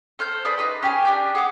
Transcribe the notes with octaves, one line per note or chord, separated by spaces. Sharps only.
A4 C5 F6 G6
G#4 A4 B4 D5
D#4 G#4 B4 B5
C#4 G4 G#4 G#5
D4 G4 G6
G#4 F#5 D6